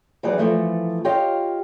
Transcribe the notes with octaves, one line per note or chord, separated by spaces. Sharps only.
E3 F#3 D#4 G#4 D5
E3 F3 A3 E4
F4 G4 C#5 D#5 F5